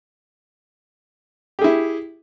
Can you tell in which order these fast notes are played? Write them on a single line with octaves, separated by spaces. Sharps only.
G4 G#4 E4